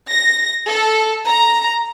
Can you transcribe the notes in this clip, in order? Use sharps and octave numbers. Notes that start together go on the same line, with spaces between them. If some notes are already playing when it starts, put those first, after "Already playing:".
A#6
A4
A#5